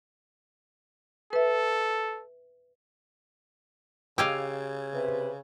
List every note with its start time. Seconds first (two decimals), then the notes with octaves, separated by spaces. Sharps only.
1.33 A4 B4 E5
4.18 C#3 G4 D#5 F5 E6 G#6
4.94 C3 B4